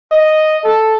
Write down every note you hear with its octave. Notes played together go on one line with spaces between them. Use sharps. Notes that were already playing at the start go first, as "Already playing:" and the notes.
D#5
A4